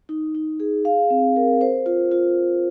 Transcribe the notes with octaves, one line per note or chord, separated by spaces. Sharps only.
D#4
D#4
G#4
F5
C4
A#4
C5
F4
F4